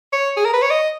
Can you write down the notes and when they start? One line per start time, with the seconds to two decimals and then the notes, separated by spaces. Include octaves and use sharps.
0.13 C#5
0.37 G#4
0.45 A#4
0.54 B4
0.62 C#5
0.71 D#5